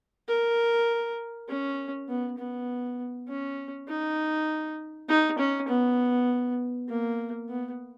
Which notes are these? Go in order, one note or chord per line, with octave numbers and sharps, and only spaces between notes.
A#4
C#4
B3
B3
C#4
D#4
D#4
C#4
B3
A#3
B3